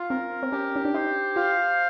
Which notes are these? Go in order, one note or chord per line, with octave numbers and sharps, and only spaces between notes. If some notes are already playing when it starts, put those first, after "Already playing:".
Already playing: F4
C4 A#4
C4
C#4 G4
C#4
D4
D#4 C5
F4 F5